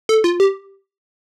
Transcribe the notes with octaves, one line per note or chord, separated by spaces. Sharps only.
A4
F4
G4